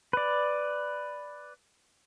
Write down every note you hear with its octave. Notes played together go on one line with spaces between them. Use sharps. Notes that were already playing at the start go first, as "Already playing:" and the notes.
B4 D5